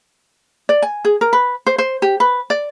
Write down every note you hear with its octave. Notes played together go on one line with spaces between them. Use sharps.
D5
G#5
G#4
A#4
B4
C5
C5
G4
B4
D5